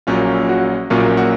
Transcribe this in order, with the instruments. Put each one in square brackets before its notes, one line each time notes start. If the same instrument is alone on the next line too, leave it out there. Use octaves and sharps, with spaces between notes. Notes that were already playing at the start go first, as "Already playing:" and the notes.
[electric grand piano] A#1 A#2 F#3 A#3 C#4 F4
F#4
A#1 A#2 F#3 A#3 C#4 F4
F#4